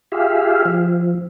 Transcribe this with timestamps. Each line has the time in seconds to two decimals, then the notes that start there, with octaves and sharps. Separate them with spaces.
0.12 F4 G4 G#4 E5 F5
0.65 F3